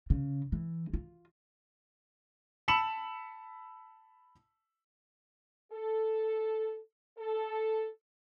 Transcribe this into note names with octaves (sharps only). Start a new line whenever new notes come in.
C#3
E3
F4
A5 B5 E6 C#7 E7 F#7
A4
A4